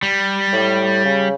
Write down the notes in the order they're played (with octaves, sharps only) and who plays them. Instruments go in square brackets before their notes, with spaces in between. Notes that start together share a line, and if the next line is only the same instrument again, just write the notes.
[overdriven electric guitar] G3
[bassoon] A2
C#3